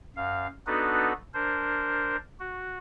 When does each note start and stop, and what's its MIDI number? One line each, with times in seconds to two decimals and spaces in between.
0.16 0.47 42
0.16 0.47 77
0.67 1.13 59
0.67 1.13 62
0.67 1.13 63
0.67 1.13 66
0.67 1.13 69
0.67 1.13 71
1.34 2.16 62
1.34 2.16 70
1.34 2.16 72
2.40 2.78 66